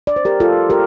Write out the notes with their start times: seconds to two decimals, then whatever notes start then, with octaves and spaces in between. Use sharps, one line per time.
0.07 D5
0.16 C5
0.25 G4 A#4
0.40 F4 A4
0.70 G4 A#4